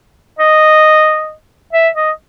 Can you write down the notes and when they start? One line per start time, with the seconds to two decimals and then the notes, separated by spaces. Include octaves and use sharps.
0.39 D#5
1.73 E5
1.95 D#5